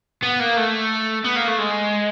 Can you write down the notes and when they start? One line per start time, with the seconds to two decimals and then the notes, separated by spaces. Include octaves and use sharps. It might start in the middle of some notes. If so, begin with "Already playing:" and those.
0.23 B3
0.40 A#3
0.57 A3
1.25 B3
1.36 A#3
1.48 A3
1.59 G#3